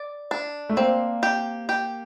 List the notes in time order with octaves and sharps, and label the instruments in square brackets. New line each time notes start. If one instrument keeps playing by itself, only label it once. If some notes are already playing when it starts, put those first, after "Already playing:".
Already playing: [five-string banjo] D5
D4
[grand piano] A3
[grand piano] A#3 [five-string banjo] C4
[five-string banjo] G4
G4